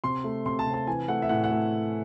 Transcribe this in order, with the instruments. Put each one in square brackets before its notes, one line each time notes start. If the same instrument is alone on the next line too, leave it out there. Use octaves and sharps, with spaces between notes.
[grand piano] C3 C6
A3
C3 C6
A5
C3
A5
E3 G#5
A3 F#5
E5
A2 F#5
F#5
A3